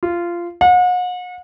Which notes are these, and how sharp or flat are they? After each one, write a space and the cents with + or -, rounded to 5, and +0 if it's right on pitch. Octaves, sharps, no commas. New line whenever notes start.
F4 -15
F#5 -40